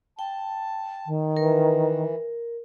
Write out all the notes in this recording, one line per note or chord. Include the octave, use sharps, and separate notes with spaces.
G5 A5
D#3
E3 A#4